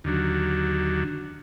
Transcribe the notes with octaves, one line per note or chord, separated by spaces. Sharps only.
D#2 D3 F#3